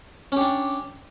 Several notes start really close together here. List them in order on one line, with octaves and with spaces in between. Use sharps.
C#4 G4 D4